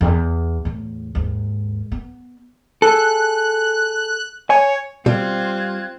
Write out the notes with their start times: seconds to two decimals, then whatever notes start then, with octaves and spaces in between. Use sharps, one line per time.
0.01 E2
0.65 E2 A2
1.15 D#2 G#2
1.92 B3
2.82 G#4 A4 F#6
4.50 C#5 G#5
5.06 B2 G3 C4 F4 F#6 G#6